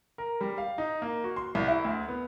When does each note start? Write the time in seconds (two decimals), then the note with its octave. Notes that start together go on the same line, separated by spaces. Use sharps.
0.18 A#4
0.41 G3
0.58 F5
0.78 D#4
1.02 A#3
1.24 F#4
1.36 C6
1.55 C2
1.68 E4
1.85 D2
2.09 B3